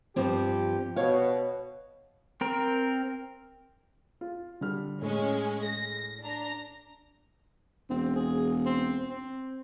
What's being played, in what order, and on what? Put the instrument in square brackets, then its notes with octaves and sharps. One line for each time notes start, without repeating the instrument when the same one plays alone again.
[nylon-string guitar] G2 F3 C4 [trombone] G4
[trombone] B2 [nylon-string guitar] C#5 F5
[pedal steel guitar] C4 A#4
[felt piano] F4
D3 G3 F6
[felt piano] A2 [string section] G#3 C#4
[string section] A#6
D4 A#5
[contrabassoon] E1 [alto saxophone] C4
[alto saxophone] G#4
C4
C4